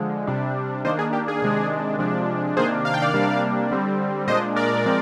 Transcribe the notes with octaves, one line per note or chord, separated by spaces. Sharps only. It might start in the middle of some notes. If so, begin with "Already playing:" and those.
Already playing: D3 F3 G#3
C3 G3 D4
D#3 A#3 D4 C5 D#5
G#4
G4
G#4
C3 D#3 G#3 D4
C3 F3 G#3 D4
C3 D#3 A#3 D4 G#4 C5
F5
G5
D5 F5
C3 G3 A#3 D4
D3 G3 C4
A#2 G#3 D4 C5 D#5
A#4 D5
F3 G#3 C4